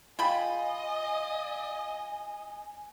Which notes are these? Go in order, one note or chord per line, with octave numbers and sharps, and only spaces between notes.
F4 G#4 D#5 G5 G#5 B5